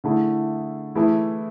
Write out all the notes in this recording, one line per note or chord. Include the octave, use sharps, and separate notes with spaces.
D3 A3 E4 G#4
E3 A3 E4 G#4